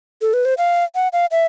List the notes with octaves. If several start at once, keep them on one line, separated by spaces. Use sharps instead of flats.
A4
B4
C5
F5
F#5
F5
E5